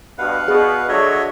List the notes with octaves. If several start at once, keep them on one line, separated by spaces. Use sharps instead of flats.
G2 B2 B4 F5 F#5
B2 G#4
D3 F#3 F#4 C#5 D#5 E5